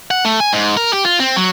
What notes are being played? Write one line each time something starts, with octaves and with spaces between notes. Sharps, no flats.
F#5
A3
G#5
G#2
A#4
G4
F4
C4
F#3